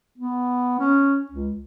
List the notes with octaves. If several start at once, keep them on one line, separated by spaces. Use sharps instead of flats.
B3
C#4
C#2